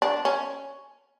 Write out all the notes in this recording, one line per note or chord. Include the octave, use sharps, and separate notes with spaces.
D4
C#4